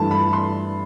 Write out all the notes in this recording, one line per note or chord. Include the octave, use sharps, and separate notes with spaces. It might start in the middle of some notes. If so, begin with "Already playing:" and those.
Already playing: G2 E3 A3 A5
B5
C6